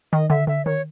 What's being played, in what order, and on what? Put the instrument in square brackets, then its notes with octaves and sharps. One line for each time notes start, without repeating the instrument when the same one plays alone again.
[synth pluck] D#3 [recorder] D#5
[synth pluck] D3 [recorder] E5
[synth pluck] D3 [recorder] E5
[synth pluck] D#3 [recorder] C#5